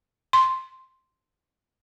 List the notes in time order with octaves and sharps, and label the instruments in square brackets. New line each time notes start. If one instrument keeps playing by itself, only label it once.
[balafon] C6